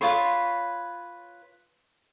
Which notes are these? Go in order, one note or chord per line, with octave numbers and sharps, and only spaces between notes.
F4 B4 C#5 C6